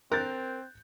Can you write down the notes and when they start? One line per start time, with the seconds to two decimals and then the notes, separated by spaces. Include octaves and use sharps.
0.12 C4 A#4 F#6 G6 A6